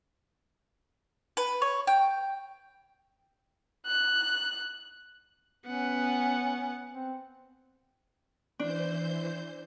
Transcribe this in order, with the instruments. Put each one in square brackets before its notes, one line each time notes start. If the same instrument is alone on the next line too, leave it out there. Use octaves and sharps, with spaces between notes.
[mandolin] B4
C#5
G5
[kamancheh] F#6
[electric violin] B3 F#5 [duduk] C#4
[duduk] C4
[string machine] E3 C5 G6 [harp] D4